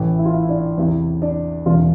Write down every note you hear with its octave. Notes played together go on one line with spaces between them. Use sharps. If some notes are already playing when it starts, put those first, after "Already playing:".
Already playing: A1 A2 E3
E4
F4
E4
D4
E2 C3 E3 E4
D4
E1 E2 C3 E3 D4 F4